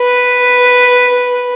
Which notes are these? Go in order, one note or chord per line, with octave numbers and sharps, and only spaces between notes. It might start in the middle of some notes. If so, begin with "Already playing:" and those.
Already playing: B4